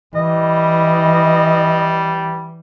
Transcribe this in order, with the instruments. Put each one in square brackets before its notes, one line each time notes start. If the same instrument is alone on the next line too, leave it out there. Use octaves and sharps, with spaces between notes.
[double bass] E3 [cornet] G3 [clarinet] D#5